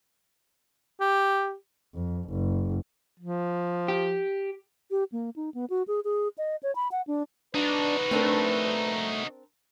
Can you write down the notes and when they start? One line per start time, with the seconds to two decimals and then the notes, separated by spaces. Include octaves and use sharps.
1.01 G4
1.94 F2
2.29 F#1
3.20 F3
3.88 G4
4.91 G4
5.12 A#3
5.36 D#4
5.54 B3
5.70 F#4
5.88 G#4
6.04 G#4
6.38 D#5
6.63 C#5
6.75 B5
6.92 F#5
7.07 D4
7.55 D4 D#4 F#4 B4
8.11 A3 C4 D4 A#4